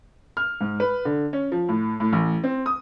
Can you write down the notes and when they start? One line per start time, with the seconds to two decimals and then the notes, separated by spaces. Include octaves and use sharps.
0.37 F6
0.61 G#2
0.80 B4
1.05 D3
1.33 C#4
1.52 F3
1.69 A2
2.00 A2
2.13 A1
2.44 C4
2.66 D#6